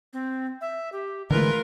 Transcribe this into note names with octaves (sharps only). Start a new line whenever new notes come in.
C4
E5
G4
D3 E3 G#3 A3 F4 A#4 B4